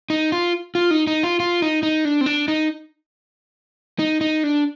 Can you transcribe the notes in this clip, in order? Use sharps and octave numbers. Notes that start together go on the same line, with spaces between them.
D#4
F4
F4
D#4
D#4
F4
F4
D#4
D#4
D4
C4
D4
D#4
D#4
D#4
D4